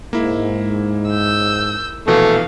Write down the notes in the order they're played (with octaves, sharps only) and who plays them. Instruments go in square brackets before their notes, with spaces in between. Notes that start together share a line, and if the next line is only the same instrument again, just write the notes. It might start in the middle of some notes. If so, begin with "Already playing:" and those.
[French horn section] G#2 [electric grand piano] A#3 E4
[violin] E6 G6
[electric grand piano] A#1 B2 E3 [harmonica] A3 [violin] F5